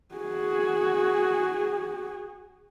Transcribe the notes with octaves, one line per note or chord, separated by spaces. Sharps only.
F#4 G#4